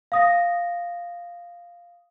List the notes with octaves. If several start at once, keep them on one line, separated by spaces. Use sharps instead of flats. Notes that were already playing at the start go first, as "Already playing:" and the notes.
F5 D#6 A#6